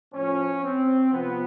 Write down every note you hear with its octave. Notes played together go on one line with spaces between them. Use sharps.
A2 F3 C#4
C4
C3 F3 B3